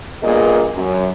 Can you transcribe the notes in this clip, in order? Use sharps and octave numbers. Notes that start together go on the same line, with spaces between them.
G2 A#2 B3 G#4 A#4 D#5
F#2